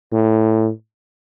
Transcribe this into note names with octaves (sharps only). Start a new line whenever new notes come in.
A2